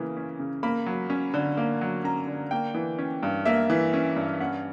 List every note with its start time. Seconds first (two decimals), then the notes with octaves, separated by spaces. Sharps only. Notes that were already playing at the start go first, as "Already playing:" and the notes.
Already playing: C#3 E3 A#3
0.17 C#4
0.39 C#3
0.63 A#3 B5
0.86 F#3
1.10 C#4
1.34 D3
1.57 A#3
1.81 F#3
2.04 C#4 A#5
2.27 D3
2.51 A#3 G5
2.74 E3
2.99 C#4
3.23 G2
3.46 A#3 E5
3.70 E3
3.93 C#4
4.16 G2
4.40 C#4 F#5